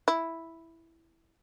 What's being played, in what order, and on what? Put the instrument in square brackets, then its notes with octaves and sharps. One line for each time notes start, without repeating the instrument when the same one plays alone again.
[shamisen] E4